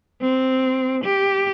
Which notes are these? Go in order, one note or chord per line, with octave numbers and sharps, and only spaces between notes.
C4
G4